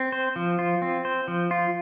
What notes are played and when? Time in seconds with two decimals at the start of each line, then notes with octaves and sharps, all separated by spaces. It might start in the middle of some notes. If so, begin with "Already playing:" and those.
Already playing: C4
0.12 C5
0.36 F3
0.59 F4
0.82 C4
1.05 C5
1.28 F3
1.51 F4